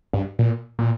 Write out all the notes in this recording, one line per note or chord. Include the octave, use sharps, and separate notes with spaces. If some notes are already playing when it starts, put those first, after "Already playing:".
G2
A#2
A#2